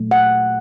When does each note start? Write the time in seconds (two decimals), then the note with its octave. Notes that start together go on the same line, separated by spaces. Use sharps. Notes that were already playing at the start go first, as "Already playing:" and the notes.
Already playing: A#2 F#3 A3
0.11 F#5